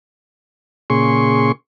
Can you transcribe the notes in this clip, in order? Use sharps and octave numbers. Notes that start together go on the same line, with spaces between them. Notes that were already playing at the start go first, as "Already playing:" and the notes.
A#2 C#3 G#4 C6 C#6